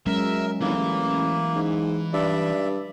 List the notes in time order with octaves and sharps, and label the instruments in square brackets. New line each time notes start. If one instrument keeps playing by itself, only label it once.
[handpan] F#3 G#3 C#4 [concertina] A#4 [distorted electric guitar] E5
[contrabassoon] G1 [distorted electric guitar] E3 [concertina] A#3
[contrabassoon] A1
G#2
[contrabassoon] G2 [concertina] D5 E5